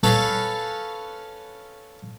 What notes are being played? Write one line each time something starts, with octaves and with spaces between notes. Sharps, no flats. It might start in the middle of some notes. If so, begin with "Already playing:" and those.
C#4 A4 B4 F5